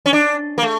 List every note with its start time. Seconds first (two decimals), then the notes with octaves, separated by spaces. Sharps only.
0.06 C#4
0.13 D4
0.58 A#3
0.63 A3